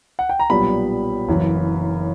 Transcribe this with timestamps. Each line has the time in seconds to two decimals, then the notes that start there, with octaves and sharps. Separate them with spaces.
0.19 F#5
0.29 G5
0.40 A#5
0.50 B1 A#2 G3 B3 B5
1.28 F#1 F#2 E3